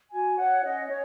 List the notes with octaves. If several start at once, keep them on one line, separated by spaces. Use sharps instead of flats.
F#4 G#5
C#5 F#5
C#4 D#5
G#4 C#5